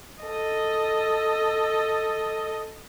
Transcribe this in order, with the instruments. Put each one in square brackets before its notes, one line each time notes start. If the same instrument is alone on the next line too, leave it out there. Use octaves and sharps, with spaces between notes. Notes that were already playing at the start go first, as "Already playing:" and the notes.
[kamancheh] A4 D#5